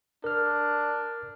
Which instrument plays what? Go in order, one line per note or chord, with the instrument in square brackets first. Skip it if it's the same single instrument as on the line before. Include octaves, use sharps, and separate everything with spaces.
[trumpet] D4 [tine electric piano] A#4 F6